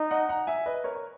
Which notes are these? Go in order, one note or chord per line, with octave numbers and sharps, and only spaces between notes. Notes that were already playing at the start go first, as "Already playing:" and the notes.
Already playing: D#4
D#5 F#5
F#5 A#5
E5 G#5
B4 D#5
A#4 C#5
C#5